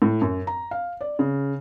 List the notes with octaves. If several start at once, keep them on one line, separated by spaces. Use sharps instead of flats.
A2
F#2
A#5
F5
D5
C#3